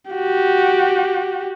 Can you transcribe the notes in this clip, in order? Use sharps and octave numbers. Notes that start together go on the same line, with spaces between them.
F#4 G4